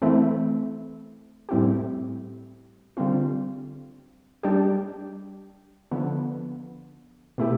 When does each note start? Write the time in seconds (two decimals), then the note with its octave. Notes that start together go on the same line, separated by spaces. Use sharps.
0.02 E3 A3 C4 E4
1.49 A2 G3 C4 E4 G4
2.97 D3 G3 C4 F4
4.43 G3 D4 G4
5.91 D3 F3 B3
7.38 B2 A3 E4 G4